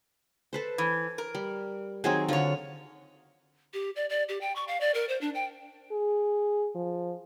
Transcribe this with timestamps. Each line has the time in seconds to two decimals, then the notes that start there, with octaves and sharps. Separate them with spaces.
0.53 A4 B4 C5
0.78 E3
1.18 A#4
1.35 G3
2.04 D#3 F#3 C4 G#4
2.28 D3 F#3 F4 C#5
3.74 G4
3.96 D5
4.10 D5
4.29 G4
4.41 G5
4.56 C#6
4.68 F5
4.81 D5
4.94 A#4
5.09 C5
5.21 D4
5.35 G5
5.92 G#4
6.75 F3